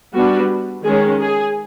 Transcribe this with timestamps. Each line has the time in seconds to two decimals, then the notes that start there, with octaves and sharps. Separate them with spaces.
0.14 G3 B3 D4 F#4
0.85 D#3 G#3 C#4 G#4
1.20 G#4